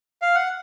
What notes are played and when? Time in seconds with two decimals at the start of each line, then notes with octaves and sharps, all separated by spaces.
0.22 F5
0.35 F#5